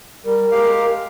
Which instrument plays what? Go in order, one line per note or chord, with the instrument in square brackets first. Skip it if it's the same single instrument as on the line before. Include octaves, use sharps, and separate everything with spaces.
[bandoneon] G3 [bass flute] A#4
[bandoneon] G#3 G4 F5